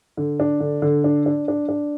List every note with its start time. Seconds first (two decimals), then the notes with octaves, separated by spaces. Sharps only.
0.17 D3
0.40 D4
0.60 D3
0.82 D3
1.04 D4
1.26 D4
1.48 D4
1.69 D4